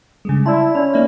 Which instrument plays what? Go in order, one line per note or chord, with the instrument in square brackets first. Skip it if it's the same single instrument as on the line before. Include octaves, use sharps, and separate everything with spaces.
[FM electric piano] C#3 G3 G#3
[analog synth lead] E4 [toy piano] D5 C6 [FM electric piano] A5 E6
[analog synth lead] C#4 [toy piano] D5 B5
[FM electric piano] A#3 D#4 E5 [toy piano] D5